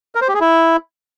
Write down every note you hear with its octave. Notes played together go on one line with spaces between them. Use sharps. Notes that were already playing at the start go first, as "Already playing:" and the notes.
A#4
C5
G4
G#4
E4